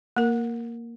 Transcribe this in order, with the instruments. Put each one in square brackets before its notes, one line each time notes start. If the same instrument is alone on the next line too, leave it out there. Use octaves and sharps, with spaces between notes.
[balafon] A#3 A#4